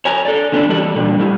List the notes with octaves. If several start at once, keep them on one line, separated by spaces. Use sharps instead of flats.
C#5 G#5 A#5
A4 D5
D3 B3 C#4 D4
E3 G3 A4 D5
A#2 D3 G3
A2 G3 E4